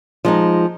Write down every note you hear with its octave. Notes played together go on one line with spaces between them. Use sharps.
F3 G#3 D#4